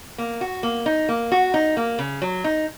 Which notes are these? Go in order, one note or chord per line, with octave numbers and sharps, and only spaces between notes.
A#3
F#4
A#3
D#4
A#3
F#4
D#4
A#3
C#3
F#3
D#4